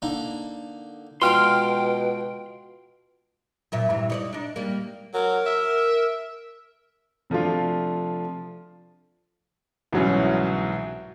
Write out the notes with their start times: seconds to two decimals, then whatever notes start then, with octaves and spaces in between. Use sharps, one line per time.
0.02 D3 A#3 D#4
1.22 B2 F3 G#3 G5 C6 F6
3.72 F#2 A#2 E5
3.90 G2 C3 E3
4.10 D#4 C#5 D5
4.33 D4 D#4
4.56 G3 A#3
5.14 F#3 A#4
5.46 E5
7.30 C3 F3 A3 D4 F4
9.92 C2 G#2 B2 E3 F#3 C#4